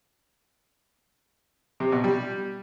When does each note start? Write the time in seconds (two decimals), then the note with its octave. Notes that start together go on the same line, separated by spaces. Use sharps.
1.80 C3
1.92 B2
2.04 G3